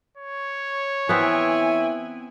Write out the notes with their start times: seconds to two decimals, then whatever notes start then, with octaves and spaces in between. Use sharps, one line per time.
0.17 C#5
1.09 E3 B3 C4 E4 G#5